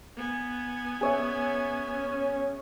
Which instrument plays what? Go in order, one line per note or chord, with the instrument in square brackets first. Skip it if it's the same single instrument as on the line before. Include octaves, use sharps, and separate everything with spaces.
[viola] B3 G#5
[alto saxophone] C#4 [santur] G#4 C#5 E5